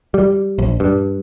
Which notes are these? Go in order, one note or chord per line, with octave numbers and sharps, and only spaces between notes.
G3
A#1
G2